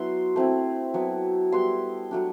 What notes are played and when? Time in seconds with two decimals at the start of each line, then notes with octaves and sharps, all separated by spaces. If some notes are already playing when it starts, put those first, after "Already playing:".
Already playing: F#3 B3 E4 C6
0.36 A3 C4 E4
0.94 F#3 B3 E4
1.52 G3 B3 E4 C6
2.11 F#3 A3 D4